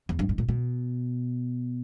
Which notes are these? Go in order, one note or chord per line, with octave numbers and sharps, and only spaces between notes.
E2
G2
G#2
A#2
B2